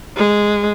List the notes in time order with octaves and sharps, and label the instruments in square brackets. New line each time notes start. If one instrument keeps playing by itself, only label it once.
[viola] G#3